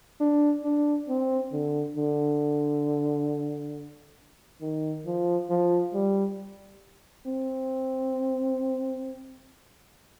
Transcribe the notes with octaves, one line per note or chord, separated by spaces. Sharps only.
D4
D4
C4
D3
D3
D#3
F3
F3
G3
C4